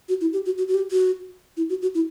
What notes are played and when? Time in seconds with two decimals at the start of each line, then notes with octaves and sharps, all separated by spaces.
0.09 F#4
0.21 E4
0.33 G4
0.46 F#4
0.58 F#4
0.68 F#4
0.74 G4
0.91 F#4
1.57 E4
1.70 F#4
1.82 F#4
1.95 E4